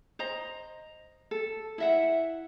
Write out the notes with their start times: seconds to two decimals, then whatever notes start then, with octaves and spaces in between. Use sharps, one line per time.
0.19 C5 D#5 A#5
1.31 A4
1.78 E4 E5 F#5